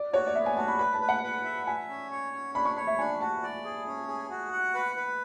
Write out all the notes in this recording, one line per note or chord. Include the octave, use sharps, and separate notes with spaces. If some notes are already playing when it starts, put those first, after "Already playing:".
Already playing: D5
F#4 C#5
D5
B3 E5
G#5
F#4 A5
B5
B4 B5
A5
B4
F#5
B4
E5
E5 G#5
C#4
C#5
C#4
D4 B5
C#6
C#5 B5
E5
D4 G#5
F#4 A5
D5
G#4
C#4
G#4
F#4
F#5
B4
B4